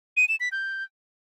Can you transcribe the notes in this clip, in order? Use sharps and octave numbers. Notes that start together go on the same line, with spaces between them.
D#7
E7
B6
G6